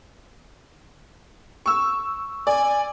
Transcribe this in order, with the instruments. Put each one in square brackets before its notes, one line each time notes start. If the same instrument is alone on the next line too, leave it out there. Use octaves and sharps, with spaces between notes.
[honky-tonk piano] C#6 E6
[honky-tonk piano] D5 [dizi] G#5